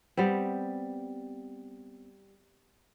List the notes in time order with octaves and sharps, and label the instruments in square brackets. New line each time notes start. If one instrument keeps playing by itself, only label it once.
[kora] G3 B3 C4